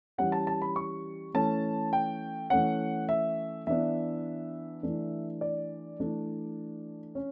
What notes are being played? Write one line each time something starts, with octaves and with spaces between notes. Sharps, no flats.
E3 G3 C#4 F#5
A5
A5
B5
C#6
E3 A3 C#4 A5
G5
E3 A3 C#4 F#5
E5
E3 B3 D4 E5
E3 A3 D4
D5
E3 A3 D4
C#4